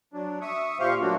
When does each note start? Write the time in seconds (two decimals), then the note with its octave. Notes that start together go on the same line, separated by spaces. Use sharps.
0.14 F#3 D4
0.41 E5 C#6 D#6
0.80 A#2 G4 C5 F5 C#6
1.01 F#3 A3 A#3 D4 F#4